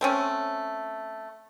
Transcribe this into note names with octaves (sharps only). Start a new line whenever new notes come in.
A3 C4 C#4